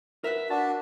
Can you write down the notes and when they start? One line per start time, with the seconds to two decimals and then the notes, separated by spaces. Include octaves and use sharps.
0.24 A#4 B4 E5 F#5
0.50 D4 F#4 A5